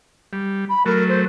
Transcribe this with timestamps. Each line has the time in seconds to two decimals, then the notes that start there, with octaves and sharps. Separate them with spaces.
0.33 G3
0.69 B5
0.86 F#3 A3 A#4
1.08 C5